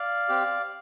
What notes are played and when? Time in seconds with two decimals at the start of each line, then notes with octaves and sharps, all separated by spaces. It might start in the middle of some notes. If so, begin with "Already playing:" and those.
Already playing: D5 F5
0.29 C4 G4